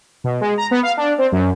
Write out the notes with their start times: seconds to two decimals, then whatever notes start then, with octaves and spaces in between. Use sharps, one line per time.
0.24 B2
0.41 G#3
0.58 A#5
0.71 B3
0.83 F5
0.97 D4
1.18 C4
1.32 F#2